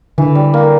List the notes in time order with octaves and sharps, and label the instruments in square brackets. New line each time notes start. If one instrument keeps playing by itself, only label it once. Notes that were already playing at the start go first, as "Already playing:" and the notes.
[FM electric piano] D3 [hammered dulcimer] E3
[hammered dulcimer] G3
A#3